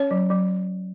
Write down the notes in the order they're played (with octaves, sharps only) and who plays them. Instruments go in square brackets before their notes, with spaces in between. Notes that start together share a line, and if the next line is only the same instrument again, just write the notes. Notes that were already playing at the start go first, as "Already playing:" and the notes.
Already playing: [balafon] C#4 C#5
F#3
F#3